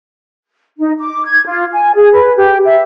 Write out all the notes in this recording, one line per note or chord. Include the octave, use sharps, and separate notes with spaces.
D#4
D6
G#6
F4
G#5
G#4
B4
G4
E5